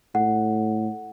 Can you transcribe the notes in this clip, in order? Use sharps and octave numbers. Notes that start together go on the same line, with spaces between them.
A2 F#5